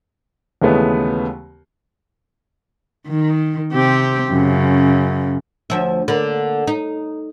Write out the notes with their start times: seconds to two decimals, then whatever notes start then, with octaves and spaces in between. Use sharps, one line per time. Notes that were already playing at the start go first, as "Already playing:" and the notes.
0.62 D#2 C#3 E3 G#3 A3 B3
3.07 D#3
3.73 C3 C4 G4
4.29 F#2 C#3
5.70 D2 F3 E5
6.08 D3 A#3
6.67 D#4